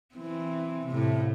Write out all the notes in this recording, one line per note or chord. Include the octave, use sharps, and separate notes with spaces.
E3 C4
A2 C3